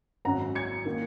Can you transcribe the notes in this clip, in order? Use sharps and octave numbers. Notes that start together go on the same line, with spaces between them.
G#1 F#2 F#3 C#4 F#5 A#5
G#6 C#7
D#3 A#3